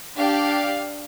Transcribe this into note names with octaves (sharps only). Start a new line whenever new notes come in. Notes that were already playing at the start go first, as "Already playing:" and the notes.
D4 G4 F5